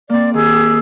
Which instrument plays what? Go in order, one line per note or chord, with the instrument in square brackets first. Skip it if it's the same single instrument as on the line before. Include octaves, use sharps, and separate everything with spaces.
[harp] A#3 C4 [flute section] D5
[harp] D#3 [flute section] G4 G#4 E6